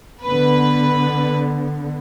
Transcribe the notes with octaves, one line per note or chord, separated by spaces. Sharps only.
D3 B3 B4